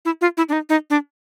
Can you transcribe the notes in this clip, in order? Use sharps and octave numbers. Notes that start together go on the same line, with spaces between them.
E4
F4
E4
D4
D#4
D#4
D4